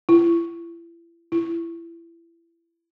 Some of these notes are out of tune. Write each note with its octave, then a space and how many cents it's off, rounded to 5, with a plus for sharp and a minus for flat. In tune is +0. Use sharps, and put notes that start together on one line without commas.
E4 +35
E4 +25